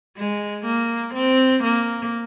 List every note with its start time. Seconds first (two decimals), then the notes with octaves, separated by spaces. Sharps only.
0.17 G#3
0.65 A#3
1.14 C4
1.63 A#3